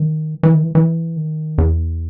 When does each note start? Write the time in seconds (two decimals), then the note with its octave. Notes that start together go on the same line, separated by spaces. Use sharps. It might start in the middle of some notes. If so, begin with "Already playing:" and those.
Already playing: D#3
0.43 E3
0.54 D#3
0.63 E3
0.75 E3
1.16 D#3
1.58 E2